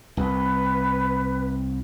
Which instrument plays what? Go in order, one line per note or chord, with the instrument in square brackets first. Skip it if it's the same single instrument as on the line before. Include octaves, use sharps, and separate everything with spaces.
[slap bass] C2 [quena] B4